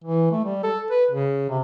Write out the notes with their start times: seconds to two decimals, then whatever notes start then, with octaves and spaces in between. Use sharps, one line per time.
0.04 E3
0.31 A3
0.45 G3
0.63 A4
0.90 B4
1.11 C#3
1.50 C3